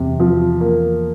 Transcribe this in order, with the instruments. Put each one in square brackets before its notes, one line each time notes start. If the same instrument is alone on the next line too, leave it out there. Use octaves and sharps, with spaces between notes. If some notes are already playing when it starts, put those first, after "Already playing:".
Already playing: [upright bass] E2 [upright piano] C3
[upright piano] F3
A#3